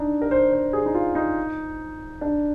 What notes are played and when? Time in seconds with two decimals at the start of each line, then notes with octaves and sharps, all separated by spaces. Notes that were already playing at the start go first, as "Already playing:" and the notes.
Already playing: D4 D#4
0.22 A#4
0.31 C5
0.52 C5
0.73 G#4
0.86 D#4
0.95 F4
1.15 D#4
2.21 D4